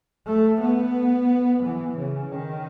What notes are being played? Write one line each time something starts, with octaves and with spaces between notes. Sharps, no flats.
A3
B3
E3
C#3
D#3